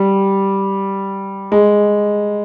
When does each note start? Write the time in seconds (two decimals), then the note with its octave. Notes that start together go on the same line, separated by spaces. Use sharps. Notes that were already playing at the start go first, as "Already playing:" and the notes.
Already playing: G3
1.52 G#3